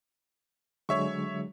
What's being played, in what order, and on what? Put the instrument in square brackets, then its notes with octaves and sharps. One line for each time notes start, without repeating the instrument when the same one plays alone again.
[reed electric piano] D3 F#3 G#3 [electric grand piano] C#5 E5 C#6